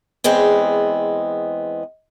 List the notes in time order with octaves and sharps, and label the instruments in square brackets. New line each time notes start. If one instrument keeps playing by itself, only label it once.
[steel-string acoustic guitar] E2 G#3 B3 C4